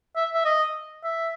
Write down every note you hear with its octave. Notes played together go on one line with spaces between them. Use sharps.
E5
E5
D#5
E5